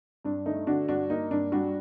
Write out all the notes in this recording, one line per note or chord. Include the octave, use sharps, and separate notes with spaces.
G2 D4
A3 D#4
D3 D4 F#4
G2 D4 F#4
A#3 D#4
G2 D4
G3 D4 F#4